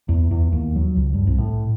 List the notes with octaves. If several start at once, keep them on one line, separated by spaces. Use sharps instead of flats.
E2
E2
D#2
F#3
C#2
G2
C2
A2